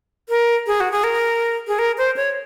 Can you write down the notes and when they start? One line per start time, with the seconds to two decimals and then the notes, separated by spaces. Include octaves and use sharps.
0.29 A#4
0.67 G#4
0.80 F#4
0.92 G#4
1.04 A#4
1.68 G#4
1.79 A#4
1.98 C5
2.16 C#5